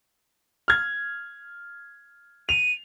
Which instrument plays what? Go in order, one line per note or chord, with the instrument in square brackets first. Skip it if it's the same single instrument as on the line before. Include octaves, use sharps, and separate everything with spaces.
[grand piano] F6 G#6
[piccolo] D#7 [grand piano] F7